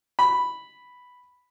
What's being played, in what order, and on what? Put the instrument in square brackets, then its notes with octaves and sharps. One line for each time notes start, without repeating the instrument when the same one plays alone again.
[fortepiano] B5